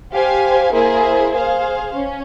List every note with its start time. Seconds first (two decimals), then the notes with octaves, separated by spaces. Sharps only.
0.12 G4 C5 F5 G#5
0.72 A#3 E4 G#4 C5
1.34 G#4 C5 F5
1.94 C#4